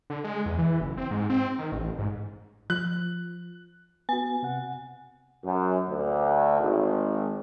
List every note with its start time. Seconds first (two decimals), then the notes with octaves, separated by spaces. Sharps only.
0.10 D3
0.24 G#3
0.46 E2
0.59 E3
0.81 F#1
0.97 C4
1.11 G#2
1.30 C4
1.59 D#3
1.72 A1
1.99 G#2
2.70 F3 F#6
4.09 B3 F#4 G#5
4.43 C3 F#5
5.44 F#2
5.89 D2
6.59 G#1